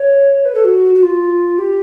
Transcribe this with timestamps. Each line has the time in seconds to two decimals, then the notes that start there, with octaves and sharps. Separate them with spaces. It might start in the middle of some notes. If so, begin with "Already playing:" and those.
Already playing: C#5
0.45 B4
0.55 A4
0.64 F#4
0.95 F#4
1.03 F4
1.58 G4